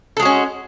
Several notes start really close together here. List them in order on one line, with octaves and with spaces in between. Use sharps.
A4 G#3 F#4 C#4